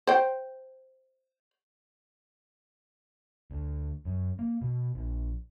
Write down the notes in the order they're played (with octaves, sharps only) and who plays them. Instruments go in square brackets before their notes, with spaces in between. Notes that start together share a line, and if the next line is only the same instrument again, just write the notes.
[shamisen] C5 G5
[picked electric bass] D2
F#2
A#3
B2
A#1